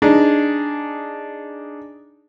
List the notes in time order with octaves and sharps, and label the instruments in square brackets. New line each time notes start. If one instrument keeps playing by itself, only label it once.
[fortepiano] D4 D#4 G#4